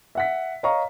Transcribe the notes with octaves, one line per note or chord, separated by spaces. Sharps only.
E5 F#5 B6
C#5 D#5 F5 A#5 C#6